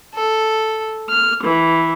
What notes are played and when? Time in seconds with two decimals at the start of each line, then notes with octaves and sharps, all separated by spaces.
0.15 A4
1.10 F6
1.43 E3